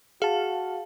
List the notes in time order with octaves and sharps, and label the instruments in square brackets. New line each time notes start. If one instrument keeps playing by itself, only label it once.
[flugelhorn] F#4 [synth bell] G#4 [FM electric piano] F5 A5